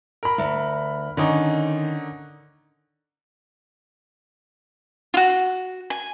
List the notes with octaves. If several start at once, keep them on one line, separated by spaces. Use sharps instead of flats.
A#4 B5
D2
D3 D#3 C#4 D#4
F4 F#4
G#5